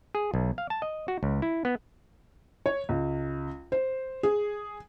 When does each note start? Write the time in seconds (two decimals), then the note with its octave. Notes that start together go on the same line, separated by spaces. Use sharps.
0.15 G#4
0.34 B1
0.58 F5
0.70 A5
0.82 D#5
1.08 F#4
1.23 C#2
1.42 E4
1.65 B3
2.66 C#5
2.89 C#2
3.72 C5
4.23 G#4